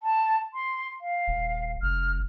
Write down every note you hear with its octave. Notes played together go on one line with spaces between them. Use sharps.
A5
C6
F5
D#1
F1 F6